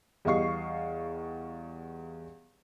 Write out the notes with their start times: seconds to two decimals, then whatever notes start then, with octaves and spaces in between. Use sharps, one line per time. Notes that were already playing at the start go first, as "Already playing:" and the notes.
0.25 E2 G3 D#5 F5 C#6 C7